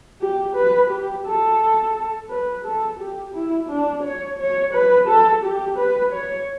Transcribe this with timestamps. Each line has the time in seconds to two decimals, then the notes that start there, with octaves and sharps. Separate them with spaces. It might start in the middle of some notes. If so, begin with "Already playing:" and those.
0.21 G4
0.56 B4
0.90 G4
1.26 A4
2.30 B4
2.65 A4
2.99 G4
3.35 E4
3.69 D4
4.03 C#5
4.39 C#5
4.74 B4
5.08 A4
5.43 G4
5.78 B4
6.12 C#5